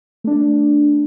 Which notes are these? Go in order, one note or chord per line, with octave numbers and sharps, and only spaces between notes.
A3 D4